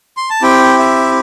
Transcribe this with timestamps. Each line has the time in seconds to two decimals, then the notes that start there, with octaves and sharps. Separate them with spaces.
0.17 C6
0.30 A5
0.42 C4 E4 G4 G5
0.79 E5